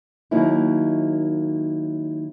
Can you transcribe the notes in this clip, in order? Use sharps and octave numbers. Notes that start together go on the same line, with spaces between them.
D#2 F#3 A#3 D#4 E4